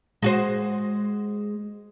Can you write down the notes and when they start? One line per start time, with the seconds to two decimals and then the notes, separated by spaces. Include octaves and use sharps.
0.22 G#3 F#4 C5